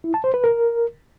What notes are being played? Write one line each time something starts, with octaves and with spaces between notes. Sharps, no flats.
E4
A5
C5
B4
A#4